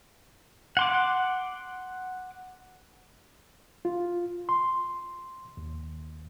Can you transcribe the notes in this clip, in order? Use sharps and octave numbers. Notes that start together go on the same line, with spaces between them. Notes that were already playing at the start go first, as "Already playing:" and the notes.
F#5 C6 D6
F4
C6
D#2